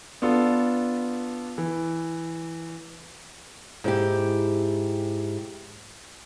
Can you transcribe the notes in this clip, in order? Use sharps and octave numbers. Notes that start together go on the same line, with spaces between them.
B3 D4 F4 A4
E3
G#2 E4 G4